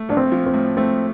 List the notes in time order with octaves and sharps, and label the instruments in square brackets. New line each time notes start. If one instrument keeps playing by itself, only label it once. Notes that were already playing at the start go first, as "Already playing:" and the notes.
Already playing: [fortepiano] A3
[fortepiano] A#1 [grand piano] D4
[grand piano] C4
[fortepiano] F3
[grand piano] C4
[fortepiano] A2
[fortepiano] A3 [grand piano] C4